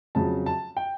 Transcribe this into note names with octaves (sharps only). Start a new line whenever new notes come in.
F2 C#3 F#3 A5
A5
G5